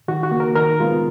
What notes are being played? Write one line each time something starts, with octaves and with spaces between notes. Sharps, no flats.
D#3 F#4
F#4
A#3
A#4
D#3 A#4
G#3 B3 F4